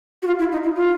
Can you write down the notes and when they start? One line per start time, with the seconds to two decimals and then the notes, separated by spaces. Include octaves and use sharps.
0.23 F#4
0.27 F4
0.39 E4
0.52 D#4
0.63 E4
0.76 F4